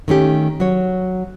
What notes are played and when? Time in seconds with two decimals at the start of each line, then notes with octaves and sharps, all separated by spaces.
0.08 D#3 A3 C#4 G4
0.60 F#3 C#5